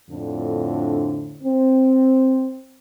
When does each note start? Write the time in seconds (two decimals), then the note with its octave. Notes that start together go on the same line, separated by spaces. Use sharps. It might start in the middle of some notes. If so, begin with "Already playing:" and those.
0.10 F2 A2 D3
1.43 C4